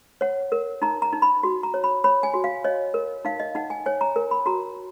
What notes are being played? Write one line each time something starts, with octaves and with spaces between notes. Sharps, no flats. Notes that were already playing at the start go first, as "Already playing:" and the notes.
C#5 F#5
A#4
D#4 A#5
A#5
D#4
B5
F#4
A#5
C#5
B5
C#5 B5
G#5
F#4
F5
C#5 D#5
A#4
D#4 F5
D#5
D#4 F#5
G#5
C#5 G#5
A#5
A#4
B5
F#4 A#5